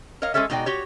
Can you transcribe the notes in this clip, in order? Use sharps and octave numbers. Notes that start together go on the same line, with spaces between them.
A#4 C#5 D#5 F5
G#3 C#4 G#4 A4 C#5 E5
B2 G#3 D#4 F#4 D5 G5
F#4 G4 C#5